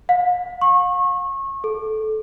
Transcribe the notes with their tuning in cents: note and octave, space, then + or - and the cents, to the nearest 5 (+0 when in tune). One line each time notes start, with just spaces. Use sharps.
F5 +45
C#6 -30
A4 -20